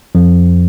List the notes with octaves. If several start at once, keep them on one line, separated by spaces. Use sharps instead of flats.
F2 F3